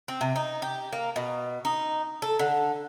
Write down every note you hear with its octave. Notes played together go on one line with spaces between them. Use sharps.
C4
C3
D#4
G4
A#3
B2
D#4
A4
D3